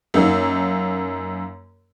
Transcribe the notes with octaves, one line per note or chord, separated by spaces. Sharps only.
F#2 A#3 D#4